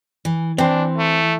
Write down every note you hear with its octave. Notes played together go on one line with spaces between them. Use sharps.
E3
E3 C4 D4 C5
A3